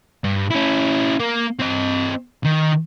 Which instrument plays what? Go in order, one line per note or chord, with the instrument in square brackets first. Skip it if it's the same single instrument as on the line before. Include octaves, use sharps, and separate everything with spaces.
[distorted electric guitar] G2
C#4 E4
A#3
C4 D#5
D#3